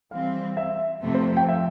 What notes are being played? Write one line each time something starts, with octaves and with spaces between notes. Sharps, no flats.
E3 G3 C4 F5
E5
F2 C3 F3 A3
C5
G5
E5